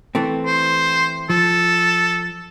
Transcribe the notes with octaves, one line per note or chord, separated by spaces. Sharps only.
E3 A3 C4
C5
F3 A4